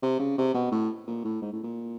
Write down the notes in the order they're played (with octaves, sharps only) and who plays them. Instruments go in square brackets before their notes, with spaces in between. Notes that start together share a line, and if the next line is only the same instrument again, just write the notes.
[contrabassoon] C3
C#3
C3
B2
A2
A#2
A2
G#2
A2
A#2